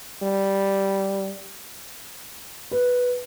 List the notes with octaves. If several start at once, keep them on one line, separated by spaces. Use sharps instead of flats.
G3
B4